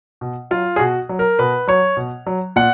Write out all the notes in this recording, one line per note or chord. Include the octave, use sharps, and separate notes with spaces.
B2
F#3 F4
G#4
B2 F#4
F#3
A#4
B2 B4
F#3 C#5
B2
F#3
A#2 F#5